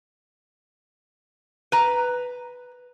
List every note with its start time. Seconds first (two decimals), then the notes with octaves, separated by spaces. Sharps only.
1.72 B4 A#5